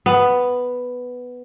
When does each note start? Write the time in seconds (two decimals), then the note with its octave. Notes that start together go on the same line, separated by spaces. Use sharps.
0.06 B3